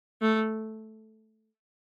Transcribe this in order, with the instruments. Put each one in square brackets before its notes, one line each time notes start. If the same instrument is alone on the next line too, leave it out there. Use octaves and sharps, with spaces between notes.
[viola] A3